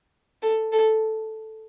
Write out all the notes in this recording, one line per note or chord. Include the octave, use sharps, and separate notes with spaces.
A4
A4